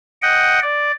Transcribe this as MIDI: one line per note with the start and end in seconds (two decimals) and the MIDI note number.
0.22 0.59 75
0.22 0.59 78
0.22 0.59 79
0.62 0.91 74